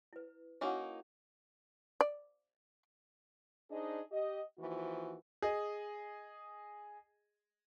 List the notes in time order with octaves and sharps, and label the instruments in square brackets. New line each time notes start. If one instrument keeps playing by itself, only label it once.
[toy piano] E4 B4
[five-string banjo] A#3 C#4 D#4 [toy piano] E4 F#4 F#5
[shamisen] D5
[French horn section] D4 D#4 G#4 C5 D#5
G4 D#5
D#2 E3 F3 F#4
[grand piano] G#4 D#5